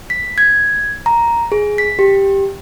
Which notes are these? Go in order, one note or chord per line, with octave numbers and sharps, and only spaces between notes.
B6
G#6
A#5
G#4
B6
G4